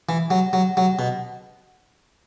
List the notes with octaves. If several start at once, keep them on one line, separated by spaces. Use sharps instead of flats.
E3
F#3
F#3
F#3
B2